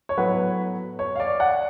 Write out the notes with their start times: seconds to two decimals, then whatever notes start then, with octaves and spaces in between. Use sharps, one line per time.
0.09 C#5
0.17 A2 F#3 B3 B4
0.99 C#5
1.16 F5
1.20 D5
1.40 F#5